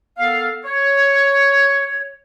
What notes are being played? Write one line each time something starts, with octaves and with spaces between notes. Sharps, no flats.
B3 A4 A#4 F5
C#5